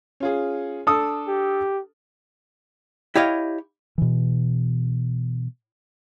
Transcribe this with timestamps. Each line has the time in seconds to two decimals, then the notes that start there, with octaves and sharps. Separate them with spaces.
0.20 C#4 F4 G#4
0.87 D4 A4 D#6
1.28 G4
3.16 E4 G4 C#5 D#5 F5
3.98 B2 E3